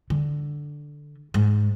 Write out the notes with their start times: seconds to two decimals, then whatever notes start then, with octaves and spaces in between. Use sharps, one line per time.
0.10 D3
1.34 G#2